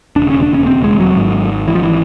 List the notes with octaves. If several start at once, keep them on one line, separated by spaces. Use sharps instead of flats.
E1 D#2 C#3 D4
C#4
D4
C#4
C4
G#3
F#3
G#1 G#2
E3
F3
E3